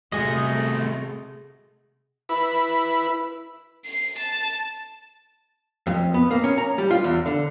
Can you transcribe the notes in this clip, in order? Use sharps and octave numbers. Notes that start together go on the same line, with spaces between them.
C3 G#3 A3 F#4 G#4 D#5 G#5
E4 B4
C7
A5
F2
B3
A#3
C#4
A#5
G3
F4
E2
D3